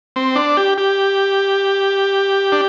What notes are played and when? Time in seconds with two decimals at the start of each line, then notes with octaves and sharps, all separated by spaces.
0.16 C4
0.36 D4
0.57 G4
0.78 G4
2.52 D4